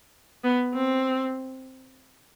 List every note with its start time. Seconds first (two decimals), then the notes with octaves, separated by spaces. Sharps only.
0.44 B3
0.74 C4